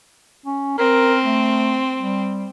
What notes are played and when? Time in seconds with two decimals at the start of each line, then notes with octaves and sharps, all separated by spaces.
0.46 C#4
0.78 C4 A#4
1.24 A3
1.99 G3